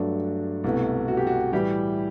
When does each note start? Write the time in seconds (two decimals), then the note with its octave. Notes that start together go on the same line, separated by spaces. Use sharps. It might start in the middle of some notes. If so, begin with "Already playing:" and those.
Already playing: G2 F#3 A3 D4
0.64 C2 B2 A3
1.08 F#4
1.17 G4
1.27 F#4
1.52 A2 E3 G3 G4